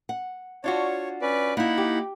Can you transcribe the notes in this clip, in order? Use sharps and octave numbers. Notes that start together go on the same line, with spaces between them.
F#5
D4 F4 F#4 C#5
C#4 B4 D5
A#3 D#4 E4 F#5 B5
G4